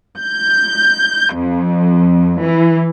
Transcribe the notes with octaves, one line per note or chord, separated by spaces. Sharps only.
G6
F2
E3